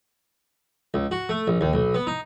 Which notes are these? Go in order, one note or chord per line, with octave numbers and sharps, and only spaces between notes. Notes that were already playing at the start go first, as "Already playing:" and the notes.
C#2
F#4
A3
A#1
D#2
B1
B3
D#4